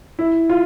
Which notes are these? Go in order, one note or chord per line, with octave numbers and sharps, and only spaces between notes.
E4
F4